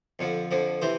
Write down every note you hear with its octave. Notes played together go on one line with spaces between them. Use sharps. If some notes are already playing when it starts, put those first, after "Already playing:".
F2 D3 F3
F2 D3 F3
C3 E3 C5